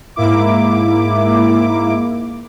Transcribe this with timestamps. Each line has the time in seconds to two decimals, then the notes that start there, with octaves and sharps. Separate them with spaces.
0.16 G#2 A#3 E4 D6